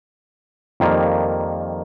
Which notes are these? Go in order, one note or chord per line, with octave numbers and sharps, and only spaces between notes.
F2 D#3 G3 A#3 F4